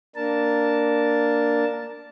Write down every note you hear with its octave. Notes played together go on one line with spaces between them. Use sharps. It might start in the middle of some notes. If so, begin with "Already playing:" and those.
A#3 D4 A#4 A5